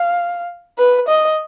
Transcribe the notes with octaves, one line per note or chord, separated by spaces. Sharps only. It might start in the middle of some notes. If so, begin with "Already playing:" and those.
Already playing: F5
B4
D#5